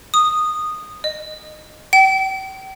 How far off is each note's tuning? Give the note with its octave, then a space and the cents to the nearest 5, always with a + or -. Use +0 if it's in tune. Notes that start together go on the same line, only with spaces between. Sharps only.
D#6 -15
D#5 -20
G5 -35